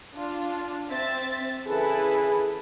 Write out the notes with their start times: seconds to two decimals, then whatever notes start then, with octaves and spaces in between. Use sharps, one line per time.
0.15 D4 F4
0.90 C4 E5 A6
1.67 C#3 E3 E4 G#4 A4 B4